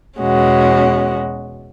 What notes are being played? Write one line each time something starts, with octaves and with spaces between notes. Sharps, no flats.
E2 B2 G#3 C#4 F#4